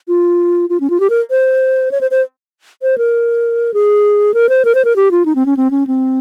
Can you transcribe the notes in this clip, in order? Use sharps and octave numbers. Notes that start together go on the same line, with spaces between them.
F4
F4
C#4
F4
G4
A#4
C5
C#5
C5
C5
C5
A#4
G#4
A#4
C5
A#4
C5
A#4
G4
F4
D#4
C4
C#4
C4
C#4
C4